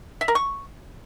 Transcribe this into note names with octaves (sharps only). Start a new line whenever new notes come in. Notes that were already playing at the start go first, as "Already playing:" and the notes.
E5
A#4
C#6